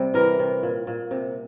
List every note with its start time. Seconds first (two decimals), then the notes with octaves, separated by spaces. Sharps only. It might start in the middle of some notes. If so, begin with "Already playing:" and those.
Already playing: C3 G3
0.14 E3 A#4
0.39 C3
0.63 A#2
0.87 A#2
1.11 C3